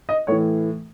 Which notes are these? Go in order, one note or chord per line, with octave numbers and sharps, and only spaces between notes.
D#5
A2 E3 C#5